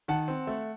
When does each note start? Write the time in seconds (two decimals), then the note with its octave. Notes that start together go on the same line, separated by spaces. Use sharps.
0.08 D#3 F#5 A5
0.28 C4
0.47 A3